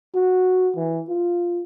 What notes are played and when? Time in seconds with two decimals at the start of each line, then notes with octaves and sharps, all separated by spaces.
0.15 F#4
0.76 E3
1.09 F4